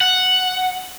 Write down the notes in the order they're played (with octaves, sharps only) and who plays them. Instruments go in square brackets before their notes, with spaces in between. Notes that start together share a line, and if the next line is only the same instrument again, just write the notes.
[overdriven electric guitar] F#5